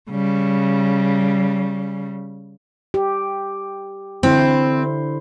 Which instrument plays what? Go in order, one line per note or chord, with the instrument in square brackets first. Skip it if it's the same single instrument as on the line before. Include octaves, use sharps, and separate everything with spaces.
[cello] C#3 G3
[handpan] G4
[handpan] D3 E4 C5 [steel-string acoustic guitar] C4